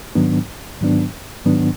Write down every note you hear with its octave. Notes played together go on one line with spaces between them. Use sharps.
G#2 D#3 F#3 B3 D4
G#2 D#3 F#3 B3 D4
G#2 D#3 F#3 B3 D4